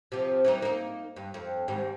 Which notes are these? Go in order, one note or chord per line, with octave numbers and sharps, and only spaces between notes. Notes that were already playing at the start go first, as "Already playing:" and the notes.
C3 F3
E3 G3 D#4
A#3 D#4
G2
F2
D#2 G#2 G3